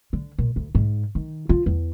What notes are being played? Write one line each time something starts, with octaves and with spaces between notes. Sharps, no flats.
D3
A#2
D2
G#2
D#3
F4
E2